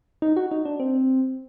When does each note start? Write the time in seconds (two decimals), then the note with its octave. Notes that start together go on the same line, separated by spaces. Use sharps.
0.22 D#4
0.36 F#4
0.51 D#4
0.65 D4
0.80 C4